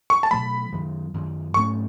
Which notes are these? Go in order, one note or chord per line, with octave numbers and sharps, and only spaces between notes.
C#6
A5
B2 F#3 A3 B5
F#2 D#3 F#3
F#2 D#3 F#3
G#2 F#3 A3 C#4 C#6